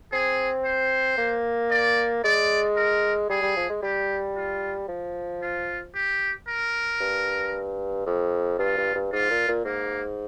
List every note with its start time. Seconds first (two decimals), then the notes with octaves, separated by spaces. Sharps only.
0.12 C4 G#4
0.65 C5
1.18 A#3
1.71 D5
2.24 G#3 D5
2.76 A#4
3.30 G3 G#4
3.42 G3
3.56 F3
3.70 G#3
3.82 G3 G4
4.36 F4
4.88 F3
5.42 F4
5.95 G4
6.48 A#4
7.00 G2
8.06 F2
8.59 G2 F4
8.77 G2
8.95 G2
9.12 G#2 F4
9.30 A#2
9.48 A#2
9.65 G#2 A#3